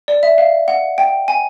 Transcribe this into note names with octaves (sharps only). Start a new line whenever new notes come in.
D5
E5
F5
F#5
G5
G#5